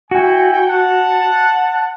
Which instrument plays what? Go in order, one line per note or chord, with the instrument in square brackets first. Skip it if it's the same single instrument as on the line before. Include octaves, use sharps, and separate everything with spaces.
[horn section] E4 G5 G#5 [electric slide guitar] F#4
[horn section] F#5 A5